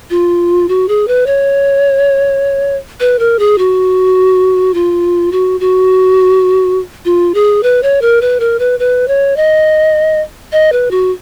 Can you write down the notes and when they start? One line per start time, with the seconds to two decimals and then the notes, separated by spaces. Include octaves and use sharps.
0.10 F4
0.69 F#4
0.88 G#4
1.08 B4
1.27 C#5
3.00 B4
3.19 A#4
3.39 G#4
3.58 F#4
4.74 F4
5.32 F#4
5.60 F#4
7.05 F4
7.34 G#4
7.63 B4
7.83 C#5
8.02 A#4
8.22 B4
8.40 A#4
8.59 B4
8.80 B4
9.08 C#5
9.37 D#5
10.52 D#5
10.72 B4
10.91 F#4